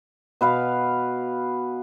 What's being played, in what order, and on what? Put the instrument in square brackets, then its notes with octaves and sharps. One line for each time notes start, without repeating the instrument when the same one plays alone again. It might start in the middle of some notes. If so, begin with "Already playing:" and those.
[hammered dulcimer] B2 B4 F5